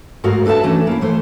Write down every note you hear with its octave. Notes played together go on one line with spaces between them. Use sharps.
G#2 A3 F#4 G#4 A#4 F5
D4 A4 B4 C5 E5 A5
E3 A3 C#4 D4
A#3 E4
E3 A3 C5